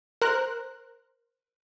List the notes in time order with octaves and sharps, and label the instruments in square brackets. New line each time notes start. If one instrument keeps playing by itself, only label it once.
[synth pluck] A#4 C5 F#6